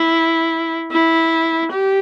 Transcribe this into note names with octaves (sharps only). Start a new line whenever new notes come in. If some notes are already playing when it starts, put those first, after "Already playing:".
Already playing: E4
E4
G4